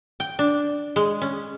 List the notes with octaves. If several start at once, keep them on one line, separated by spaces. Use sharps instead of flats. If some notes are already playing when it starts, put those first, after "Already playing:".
G5
D4
G#3
C#4